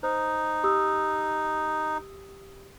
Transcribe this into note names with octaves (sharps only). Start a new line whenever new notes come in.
D#4 C5
G4 D#6 E6